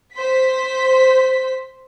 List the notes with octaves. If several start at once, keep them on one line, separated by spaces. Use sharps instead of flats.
C5 B6